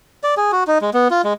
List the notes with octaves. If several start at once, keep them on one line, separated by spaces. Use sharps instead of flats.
D5
G#4
F#4
D#4
G#3
B3
F4
G#3